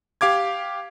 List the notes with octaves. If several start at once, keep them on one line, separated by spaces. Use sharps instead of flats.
G4 F5 D6 G#6